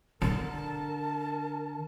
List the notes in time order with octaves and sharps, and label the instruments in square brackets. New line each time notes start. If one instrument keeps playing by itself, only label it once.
[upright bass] D3 [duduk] A#4 [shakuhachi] A5